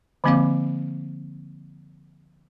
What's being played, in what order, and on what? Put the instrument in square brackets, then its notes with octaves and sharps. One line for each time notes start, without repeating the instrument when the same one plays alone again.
[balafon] D3 F3 A#3 C4 F5 D6